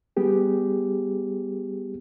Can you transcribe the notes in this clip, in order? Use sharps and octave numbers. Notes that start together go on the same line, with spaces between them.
G3 B3 G4 G#4